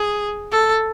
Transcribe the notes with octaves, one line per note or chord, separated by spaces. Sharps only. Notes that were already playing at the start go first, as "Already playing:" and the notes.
Already playing: G#4
A4